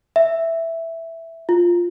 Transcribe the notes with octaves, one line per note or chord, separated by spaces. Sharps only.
E5
F4